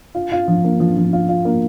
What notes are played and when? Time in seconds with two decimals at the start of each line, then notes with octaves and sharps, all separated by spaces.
0.15 F4
0.32 F4
0.48 F3
0.64 A#3
0.80 F3
0.97 F3
1.13 F4
1.29 F4
1.45 A#3